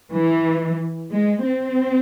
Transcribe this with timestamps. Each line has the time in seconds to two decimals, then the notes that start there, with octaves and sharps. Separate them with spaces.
0.13 E3
1.12 G#3
1.46 C4